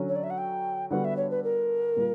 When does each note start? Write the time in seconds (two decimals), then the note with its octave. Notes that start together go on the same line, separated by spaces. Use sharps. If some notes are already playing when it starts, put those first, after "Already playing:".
Already playing: D3 F#3 C#4
0.09 C#5
0.16 D5
0.24 E5
0.30 F#5
0.38 G5
0.90 D3 G3 B3 D4 F#4 F#5
1.05 E5
1.17 C#5
1.31 B4
1.44 A#4
1.96 A#2 G3 A#3